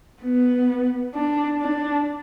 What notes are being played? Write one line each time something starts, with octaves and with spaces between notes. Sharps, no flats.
B3
D4
D4